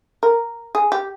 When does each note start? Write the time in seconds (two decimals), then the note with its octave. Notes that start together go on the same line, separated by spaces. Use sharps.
0.23 A#4
0.75 G#4
0.92 G4